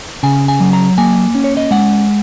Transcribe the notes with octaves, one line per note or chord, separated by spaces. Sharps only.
C#3 G#5
G#5
F#3
A#5
A#3 G#5
C#4
C#5
D#5
G#3 F#5